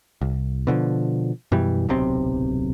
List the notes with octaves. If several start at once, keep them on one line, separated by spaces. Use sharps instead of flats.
C2
B2 D3 E3 F3
F#2 B2 E3 G3
D1 B1 C3 C4